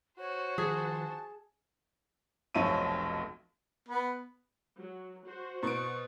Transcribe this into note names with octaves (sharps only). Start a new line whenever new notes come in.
F#4 C5 C#5
D#3 F3 G#4 A5
F1 B1 F3 C#5 E5 D#7
B3
F#3
F#4 C5
B2 C#6 D7